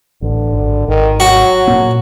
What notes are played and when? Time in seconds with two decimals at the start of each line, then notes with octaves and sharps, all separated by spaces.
0.22 A1 D3
0.53 G#1
0.88 G#1 D#3
1.20 F#3 F#4
1.67 A#2 A#3